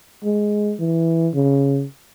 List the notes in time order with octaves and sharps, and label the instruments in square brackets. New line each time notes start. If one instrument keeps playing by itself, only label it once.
[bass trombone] G#3
E3
C#3